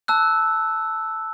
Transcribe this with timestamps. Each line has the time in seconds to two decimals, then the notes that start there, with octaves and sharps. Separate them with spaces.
0.08 A5 E6 F#6